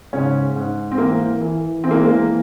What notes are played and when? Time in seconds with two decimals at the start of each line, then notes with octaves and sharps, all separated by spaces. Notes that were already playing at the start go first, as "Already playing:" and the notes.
0.13 G#2 C#3 C#4
0.55 G#2
0.92 C4
0.98 E3 A#3
1.41 E3
1.84 E3 C4
1.91 A#3
1.98 G#3
2.05 A#3
2.27 E3